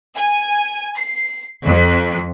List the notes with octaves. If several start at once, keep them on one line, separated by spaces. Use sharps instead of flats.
G#5
C7
F2